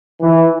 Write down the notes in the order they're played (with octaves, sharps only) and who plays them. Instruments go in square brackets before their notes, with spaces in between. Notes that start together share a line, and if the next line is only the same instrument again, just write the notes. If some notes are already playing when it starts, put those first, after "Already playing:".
[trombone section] E3